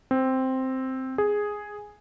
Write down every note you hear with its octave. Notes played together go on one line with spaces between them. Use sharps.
C4
G#4